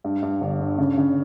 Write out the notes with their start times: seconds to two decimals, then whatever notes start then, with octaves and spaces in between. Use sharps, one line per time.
0.04 G2
0.23 G2
0.41 G1
0.60 D3
0.78 C#3
0.98 C#3